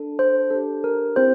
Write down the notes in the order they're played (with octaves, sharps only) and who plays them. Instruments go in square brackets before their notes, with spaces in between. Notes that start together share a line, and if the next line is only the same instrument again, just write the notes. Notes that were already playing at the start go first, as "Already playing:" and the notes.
Already playing: [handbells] D4 A4
C5
D4 G4 A4
A#4
C4 E4 G4 C5